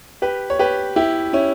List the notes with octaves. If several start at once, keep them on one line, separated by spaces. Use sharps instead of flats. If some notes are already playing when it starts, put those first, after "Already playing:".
G4 B4
C#5
G4 B4
E4 G4
C#4 E4